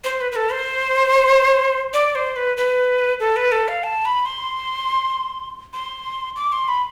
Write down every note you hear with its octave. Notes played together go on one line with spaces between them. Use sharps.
C5
B4
B4
A4
C5
D5
C5
B4
B4
A4
B4
A4
F5
A5
B5
C6
C6
D6
C6
B5